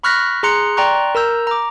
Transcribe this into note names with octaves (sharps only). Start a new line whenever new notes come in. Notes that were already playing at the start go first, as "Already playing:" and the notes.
B5 C#6 F6 F#6 A#6 B6
G#4 A#5 C6 F#6 C#7
D5 G5 A#5 C6 C#6 F#6
A#4 A#5 E6 G6
A#5 D6